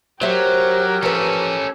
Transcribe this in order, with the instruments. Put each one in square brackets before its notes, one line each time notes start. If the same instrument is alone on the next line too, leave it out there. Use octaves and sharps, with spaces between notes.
[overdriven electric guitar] F#3 [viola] G4 A#4 [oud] C5 E5
[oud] F3 B4 [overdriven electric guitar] C#4 A4